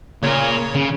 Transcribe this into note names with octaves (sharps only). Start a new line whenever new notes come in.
A#2 C#3 A#4 C#5
C#3